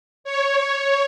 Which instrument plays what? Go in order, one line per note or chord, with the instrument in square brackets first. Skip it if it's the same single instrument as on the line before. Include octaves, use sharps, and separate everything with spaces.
[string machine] C#5